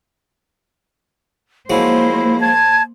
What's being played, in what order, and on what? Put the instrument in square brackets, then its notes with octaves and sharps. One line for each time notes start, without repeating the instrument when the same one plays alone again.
[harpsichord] F3 F#3 G#3 [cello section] A#3 C5 [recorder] E4
[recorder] A5 [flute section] G#6